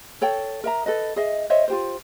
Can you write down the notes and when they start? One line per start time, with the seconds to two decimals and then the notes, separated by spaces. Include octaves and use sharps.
0.21 A4 C#5 G5
0.64 A#4 E5 A#5
0.86 A4 B4 D#5
1.16 G#4 D#5 E5
1.50 C5 C#5 D#5 E5
1.68 F4 G4 C5